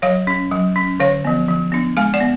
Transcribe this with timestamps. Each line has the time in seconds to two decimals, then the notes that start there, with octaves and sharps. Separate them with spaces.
0.02 F#3 C#5 F5
0.27 C#4
0.52 F#3
0.76 C#4
1.00 D3 C#5 F5
1.25 F3 B3
1.48 F3
1.72 B3 D4
1.97 G#3 F5 G#5
2.14 D5 F#5
2.21 B3